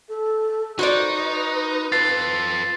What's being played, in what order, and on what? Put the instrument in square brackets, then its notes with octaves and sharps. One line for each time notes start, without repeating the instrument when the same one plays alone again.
[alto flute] A4
[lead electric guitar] D#4 [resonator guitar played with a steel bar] F#4 C5 D5 [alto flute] B4
[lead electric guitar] F4 A4 [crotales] A6 C7